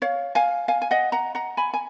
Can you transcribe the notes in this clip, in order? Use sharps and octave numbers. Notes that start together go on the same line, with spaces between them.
C#5 F5
F5 G#5
F5 G#5
G#5
D#5 F#5
F#5 A#5
F#5 A#5
G#5 B5
G#5